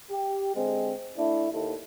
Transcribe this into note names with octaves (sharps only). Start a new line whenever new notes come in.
G4
D3 G#3 C4
A3 D4 E4
D#2 D#3 E4 A4